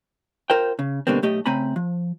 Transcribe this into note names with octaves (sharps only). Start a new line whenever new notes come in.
F4 A#4 C5 G5
C#3
B2 D3 G3 A#3 C4
B1 A3 G4 D#5
C#3 A3 C4 G#5 A#5 B5
F3